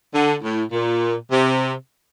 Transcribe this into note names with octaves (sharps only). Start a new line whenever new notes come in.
D3
A2
A#2
C3